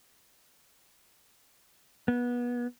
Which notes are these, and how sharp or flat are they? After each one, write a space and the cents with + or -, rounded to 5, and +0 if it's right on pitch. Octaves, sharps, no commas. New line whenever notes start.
B3 -25